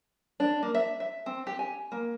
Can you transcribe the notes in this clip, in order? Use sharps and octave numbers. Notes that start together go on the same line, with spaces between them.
D4
A#3
E5
E5
C4
G4
G#5
A#3